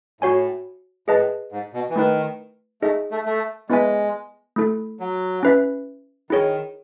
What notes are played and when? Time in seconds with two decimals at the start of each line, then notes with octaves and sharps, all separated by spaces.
0.21 A2 F#4 C#5 G#5
1.08 A2 G#4 B4 D#5 A5
1.52 G#2
1.74 B2
1.90 E3
1.96 D#3 A3 E4 B4
2.82 A3 D#4 G#4 D#5
3.11 A3
3.26 A3
3.70 G#3 B3 E4 B4 E5 G#5
4.56 A3 E4 A4
5.00 F#3
5.43 C#4 E4 B4 E5
6.30 D#3 E4 G#4 C#5